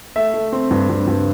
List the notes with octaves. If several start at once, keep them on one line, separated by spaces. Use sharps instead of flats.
A3 E5
A3
C4
G2
G2
G2